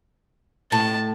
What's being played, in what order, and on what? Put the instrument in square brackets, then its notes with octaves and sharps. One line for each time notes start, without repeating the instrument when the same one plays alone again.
[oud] A2 [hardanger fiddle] A5